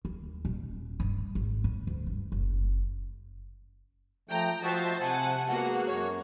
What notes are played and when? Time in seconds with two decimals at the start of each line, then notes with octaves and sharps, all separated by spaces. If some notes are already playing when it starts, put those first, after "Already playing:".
0.05 D#2
0.45 D#1
1.00 G2
1.35 G#1
1.64 A2
1.87 D2
2.07 G2
2.32 F#1
4.29 F3 A3 G5 A#5
4.62 F3 F#4 C5 D#5 E5 A5
5.00 C3 F#5 G#5 A5
5.48 G#3 A#3 B3 F#4 F#5
5.86 F#2 C#5